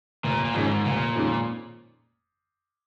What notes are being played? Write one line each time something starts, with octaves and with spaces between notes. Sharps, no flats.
F1 A#2
A#2
F2 G#2 D#3 G#3 C#4
F1 A#2
F2 D#3 G#3 C#4